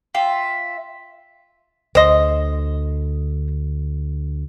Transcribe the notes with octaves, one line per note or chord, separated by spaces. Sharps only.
F4 E5 G5
D2 D3 C5 D#5